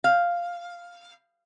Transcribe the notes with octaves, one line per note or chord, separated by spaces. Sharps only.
F5